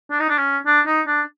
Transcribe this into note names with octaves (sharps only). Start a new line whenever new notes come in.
D4
D#4
D4
C#4
D4
D#4
D4